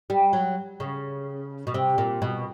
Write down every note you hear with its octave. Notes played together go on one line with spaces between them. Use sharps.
G3
F#3
C#3
B2
C3
A#2
B2